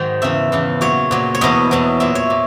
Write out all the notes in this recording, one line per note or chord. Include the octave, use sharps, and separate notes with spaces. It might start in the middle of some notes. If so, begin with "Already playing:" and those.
Already playing: G#2 D#3 F#3
E2 C#3 E3 E5
E2 C#3 E3
A#2 F#3 C#5
A#2 F#3
C#5
E2 B2 F#3 D#5
E2 B2 F#3
A#2 F#3 E5
C#5
A#2